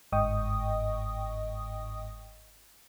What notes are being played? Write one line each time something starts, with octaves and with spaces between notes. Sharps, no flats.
G1 G#2 D#5 G5 C#6 D#6